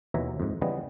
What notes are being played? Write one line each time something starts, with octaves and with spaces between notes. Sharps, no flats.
D#2 B2 E3 C#5 E5 A#5
F2 G#2
C#3 E3 G3 B3 D#5